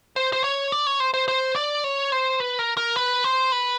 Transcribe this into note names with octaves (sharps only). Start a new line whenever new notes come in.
C5
C5
C#5
D5
C#5
C5
C5
C5
D5
C#5
C5
B4
A#4
A#4
B4
C5
B4